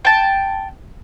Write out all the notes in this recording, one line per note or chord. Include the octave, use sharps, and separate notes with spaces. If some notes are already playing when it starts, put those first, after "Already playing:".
G5 A5